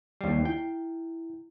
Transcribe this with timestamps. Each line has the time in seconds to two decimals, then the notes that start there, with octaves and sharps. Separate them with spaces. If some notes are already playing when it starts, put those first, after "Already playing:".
0.21 D#2 G3 C7
0.45 E4 G5